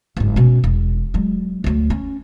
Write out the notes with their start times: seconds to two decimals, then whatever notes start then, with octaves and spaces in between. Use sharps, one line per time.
0.17 F#1 G#2
0.36 B2 C#4
0.64 E1
1.14 F#3 G#3
1.64 D2 F#3
1.90 C#4